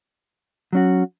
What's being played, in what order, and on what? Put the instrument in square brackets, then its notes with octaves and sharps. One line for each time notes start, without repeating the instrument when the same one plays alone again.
[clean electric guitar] F#3 C#4 F#4